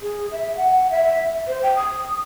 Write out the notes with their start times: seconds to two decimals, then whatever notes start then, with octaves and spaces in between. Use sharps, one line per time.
0.02 G#4
0.32 E5
0.57 F#5
0.91 E5
1.47 C5
1.63 G5
1.76 D#6